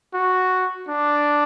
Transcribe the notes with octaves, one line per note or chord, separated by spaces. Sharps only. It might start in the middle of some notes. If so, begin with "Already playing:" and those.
F#4
D4